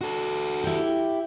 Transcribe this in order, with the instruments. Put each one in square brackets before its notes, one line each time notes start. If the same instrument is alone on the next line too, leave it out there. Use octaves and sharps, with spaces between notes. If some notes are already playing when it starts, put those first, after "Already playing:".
[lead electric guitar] F#4 A4
[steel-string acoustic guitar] E4 G4